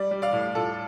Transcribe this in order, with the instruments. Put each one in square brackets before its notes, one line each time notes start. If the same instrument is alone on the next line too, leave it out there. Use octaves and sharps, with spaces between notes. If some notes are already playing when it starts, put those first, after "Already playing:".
Already playing: [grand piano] G3 D5
G3
D5 F5
A2
A2 F4 A4